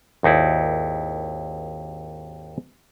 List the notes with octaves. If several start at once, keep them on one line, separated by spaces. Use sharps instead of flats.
G#1 D#2 D#4 E4 D5